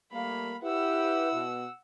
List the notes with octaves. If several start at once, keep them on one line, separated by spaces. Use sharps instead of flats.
G3 A3 A#3 F5 B5
E4 G4 B4 F#5 E6
B2